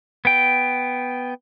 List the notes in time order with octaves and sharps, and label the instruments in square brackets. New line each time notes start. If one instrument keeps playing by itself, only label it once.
[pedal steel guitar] B3 G5